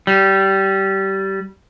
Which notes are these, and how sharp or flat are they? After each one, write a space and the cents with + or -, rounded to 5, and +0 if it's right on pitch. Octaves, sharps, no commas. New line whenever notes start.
G3 -20